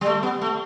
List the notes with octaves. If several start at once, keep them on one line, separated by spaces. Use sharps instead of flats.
G3
A3
B3
A3